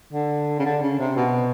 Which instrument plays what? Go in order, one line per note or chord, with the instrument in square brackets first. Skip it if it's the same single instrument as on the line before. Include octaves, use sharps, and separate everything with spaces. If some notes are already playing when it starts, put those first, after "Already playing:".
[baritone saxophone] D3
C#3
D3
C#3
C3
B2